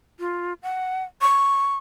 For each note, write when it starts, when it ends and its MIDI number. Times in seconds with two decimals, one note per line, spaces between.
0.20 0.53 65
0.63 1.03 78
1.21 1.77 85